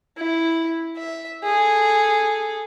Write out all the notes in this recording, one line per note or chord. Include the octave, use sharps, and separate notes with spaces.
E4
E5
G#4 A4